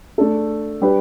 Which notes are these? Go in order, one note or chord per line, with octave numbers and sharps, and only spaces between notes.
A3 D4 A4
G3 D4 G4 B4